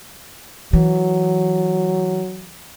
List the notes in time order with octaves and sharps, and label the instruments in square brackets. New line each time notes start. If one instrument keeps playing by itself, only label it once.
[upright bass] E3 [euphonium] F#3